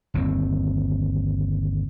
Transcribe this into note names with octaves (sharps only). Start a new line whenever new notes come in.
G1 D#2 C4